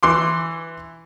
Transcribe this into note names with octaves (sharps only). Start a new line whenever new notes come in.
E3 C6 D6